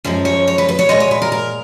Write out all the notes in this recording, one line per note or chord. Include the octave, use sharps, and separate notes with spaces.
F#2 F3 G#3
C#5
C#5
B4
B4
C#5
A#2 G#3 D#5
C#5
B4
A#4
A#4